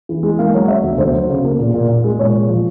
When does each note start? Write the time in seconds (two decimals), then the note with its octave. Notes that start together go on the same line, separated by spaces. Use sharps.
0.09 E3
0.23 G#3
0.39 A#3 F5
0.54 F#3
0.68 F#3 E5
0.83 D2
0.98 D2 C5
1.14 F#3
1.29 C#3
1.44 A#3
1.59 A#2
1.74 A#2
1.88 A#2
2.04 G#3
2.19 A#2 C#5
2.34 A#2
2.48 F3